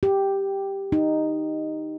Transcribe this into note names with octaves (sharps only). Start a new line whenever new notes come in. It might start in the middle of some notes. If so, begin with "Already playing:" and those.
G4
D#4